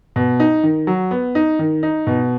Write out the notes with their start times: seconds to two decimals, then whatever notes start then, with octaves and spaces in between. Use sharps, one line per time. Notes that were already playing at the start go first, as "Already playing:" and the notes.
0.16 B2
0.40 D#4
0.64 D#3
0.87 F#3
1.11 B3
1.35 D#4
1.59 D#3
1.83 D#4
2.07 B2